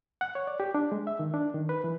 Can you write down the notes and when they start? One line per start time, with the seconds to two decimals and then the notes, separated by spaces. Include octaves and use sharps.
0.21 F#5
0.35 C#5
0.47 D5
0.60 G4
0.75 D4
0.92 G#3
1.07 E5
1.19 D#3
1.34 D4
1.54 D#3
1.69 B4
1.84 E3